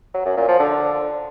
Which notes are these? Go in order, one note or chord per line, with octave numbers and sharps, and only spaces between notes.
F#3
F#2
A#2
F3
D3